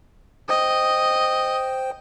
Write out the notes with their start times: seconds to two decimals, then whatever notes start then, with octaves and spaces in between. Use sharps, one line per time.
0.49 C5 D#5 G5